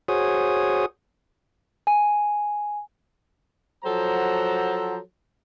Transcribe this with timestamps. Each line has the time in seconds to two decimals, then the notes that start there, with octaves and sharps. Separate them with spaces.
0.08 F#4 G#4 C5 C#5 D#6
1.87 G#5
3.85 F3 F#3 A4 C5 F#5 A#5